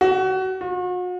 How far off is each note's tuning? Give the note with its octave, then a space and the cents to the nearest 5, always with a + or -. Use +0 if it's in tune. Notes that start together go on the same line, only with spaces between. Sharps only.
F#4 +30
F#4 -40